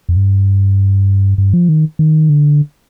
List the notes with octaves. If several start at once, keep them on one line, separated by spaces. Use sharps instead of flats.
F2
G2
G2
F3
D#3
D#3
D3